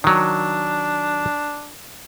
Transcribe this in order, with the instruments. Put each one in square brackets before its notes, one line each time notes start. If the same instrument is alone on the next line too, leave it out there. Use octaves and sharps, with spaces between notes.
[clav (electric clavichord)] D#3 F#3 [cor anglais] D4